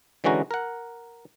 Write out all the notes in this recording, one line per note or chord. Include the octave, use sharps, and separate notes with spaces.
D3 E3 G#3 C#4 F#4 A#5
A#4 F#5